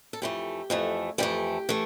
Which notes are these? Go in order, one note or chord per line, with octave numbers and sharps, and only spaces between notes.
A4
F2 E3 G3 A3 G4
F2 E3 A3
F2 E3 G3 A3 G4
E3 A3